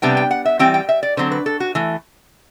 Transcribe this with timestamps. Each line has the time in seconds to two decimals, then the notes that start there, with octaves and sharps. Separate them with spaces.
0.02 C3 G3 B3 D4 G5
0.17 G5
0.31 F#5
0.45 E5
0.59 E3 G3 C4 G5
0.74 G5
0.89 E5
1.03 D5
1.17 D3 F#3 C4 C5
1.32 B4
1.46 A4
1.60 F#4
1.75 E3 A3